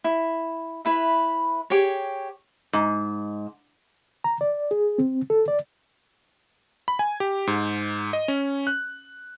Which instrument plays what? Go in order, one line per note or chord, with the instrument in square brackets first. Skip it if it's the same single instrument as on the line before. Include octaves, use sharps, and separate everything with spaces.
[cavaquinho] E4
E4 B4 E5
G4 G#4 C#5
[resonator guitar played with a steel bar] G#2
[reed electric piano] A#5
D5
G#4
C4
A4
D5
[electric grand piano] B5
G#5
G4
G#2
D#5
C#4
F#6